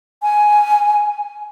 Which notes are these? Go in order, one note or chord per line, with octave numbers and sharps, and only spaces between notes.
G#5